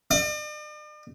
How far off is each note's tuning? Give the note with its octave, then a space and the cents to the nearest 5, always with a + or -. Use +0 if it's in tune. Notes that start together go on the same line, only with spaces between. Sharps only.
D5 +45